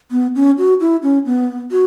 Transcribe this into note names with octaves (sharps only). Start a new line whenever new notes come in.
B3
C#4
F#4
E4
C#4
B3
F#4